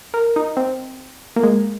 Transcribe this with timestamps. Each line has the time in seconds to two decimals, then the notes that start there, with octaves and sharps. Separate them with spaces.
0.14 A#4
0.36 D#4
0.57 C4
1.36 A#3
1.43 G#3